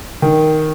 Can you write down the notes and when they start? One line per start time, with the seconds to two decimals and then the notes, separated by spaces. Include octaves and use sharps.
0.22 D#3